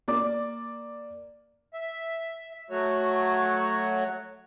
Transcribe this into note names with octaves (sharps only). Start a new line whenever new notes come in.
A#3 D5 D6
E5
F#3 A3 F#4 C#5